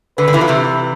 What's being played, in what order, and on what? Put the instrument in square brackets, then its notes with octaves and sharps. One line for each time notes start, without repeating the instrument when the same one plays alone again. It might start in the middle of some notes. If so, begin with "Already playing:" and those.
[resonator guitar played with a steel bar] D3 [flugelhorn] B4
[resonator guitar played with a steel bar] D3
C3 E3
F3
C3 E3